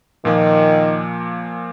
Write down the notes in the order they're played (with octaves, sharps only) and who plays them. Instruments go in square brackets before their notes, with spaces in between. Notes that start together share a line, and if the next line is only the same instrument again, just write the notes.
[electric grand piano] A#2 F3 A#3 [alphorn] D#3